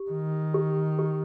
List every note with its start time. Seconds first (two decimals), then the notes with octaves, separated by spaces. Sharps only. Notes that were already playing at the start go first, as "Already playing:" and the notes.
Already playing: G4
0.11 D#3
0.54 G4
0.99 G4